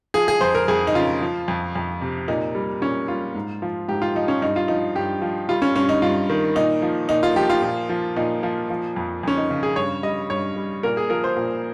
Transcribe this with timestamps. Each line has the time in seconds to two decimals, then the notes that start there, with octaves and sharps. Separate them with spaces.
0.14 F3 G#4
0.28 G#4
0.41 F2 C5
0.55 A#4
0.68 F2 G#4
0.87 D#4
0.95 C#3 F4
1.22 F3
1.48 F2
1.75 F2
2.01 C3
2.28 A#2 D#4
2.55 G3
2.81 A#2 C#4
3.08 G3 F4
3.35 G#2
3.62 F3
3.88 G#2 G4
4.02 F4
4.15 F3 D#4
4.28 C#4
4.42 G2 D#4
4.56 F4
4.68 F3 D#4
4.95 G2 G4
5.22 F3
5.49 G3 F4
5.62 C#4
5.76 G2 C#4
5.89 D#4
6.02 G2 F4
6.30 D#3
6.55 A#2 D#4
6.82 F3
7.09 A#2 D#4
7.23 F4
7.36 F3 G4
7.50 F4
7.62 A#2
7.89 F3
8.16 A#2 D#4
8.43 F3
8.70 F3
8.96 F2
9.23 F2 C#4
9.37 D#4
9.50 C#3
9.63 G#4
9.76 G2 C#5
10.03 G3 D#5
10.30 G2 C#5
10.56 G3
10.83 A#2 A#4
10.97 G#4
11.10 F3 A#4
11.24 C5
11.37 A#2